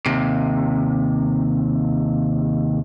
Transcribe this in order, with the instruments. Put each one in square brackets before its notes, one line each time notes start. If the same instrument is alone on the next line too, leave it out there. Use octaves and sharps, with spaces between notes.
[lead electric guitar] D#2 C3